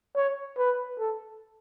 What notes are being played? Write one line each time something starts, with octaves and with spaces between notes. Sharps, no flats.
C#5
B4
A4